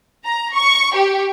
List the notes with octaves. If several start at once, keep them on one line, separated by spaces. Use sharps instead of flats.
A#5
C#6
G4